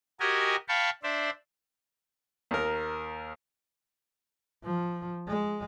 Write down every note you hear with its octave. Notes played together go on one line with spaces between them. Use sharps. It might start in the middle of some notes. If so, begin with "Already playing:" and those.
F#4 G4 A#4 D#5 G#5
F5 G5 A5 B5 C#6
D4 C5 D5 E5
D#2 A#4
F3
G#3